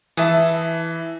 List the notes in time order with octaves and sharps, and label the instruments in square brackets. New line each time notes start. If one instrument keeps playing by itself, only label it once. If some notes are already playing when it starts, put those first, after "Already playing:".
[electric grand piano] E3 [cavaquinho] E5 A5 D#6